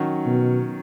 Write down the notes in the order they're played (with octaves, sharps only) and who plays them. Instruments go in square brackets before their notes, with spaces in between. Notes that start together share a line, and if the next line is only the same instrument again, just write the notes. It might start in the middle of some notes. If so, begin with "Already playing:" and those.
Already playing: [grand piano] D#3 F#3 C#4
[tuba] B2